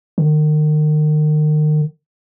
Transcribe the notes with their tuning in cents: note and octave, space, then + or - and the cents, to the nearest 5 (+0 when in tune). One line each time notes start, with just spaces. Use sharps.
D#3 -35